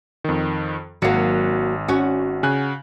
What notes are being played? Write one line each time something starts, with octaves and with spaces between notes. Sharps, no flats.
F2 D#3
G#1 F#3 A#3 C#7
C#4 F#4
C#3 G#5 F#6